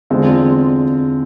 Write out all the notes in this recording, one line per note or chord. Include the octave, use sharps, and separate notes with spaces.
E2 D3 G#3 C4 F4